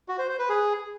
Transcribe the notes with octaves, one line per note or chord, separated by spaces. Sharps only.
F#4
C5
C5
B4
G#4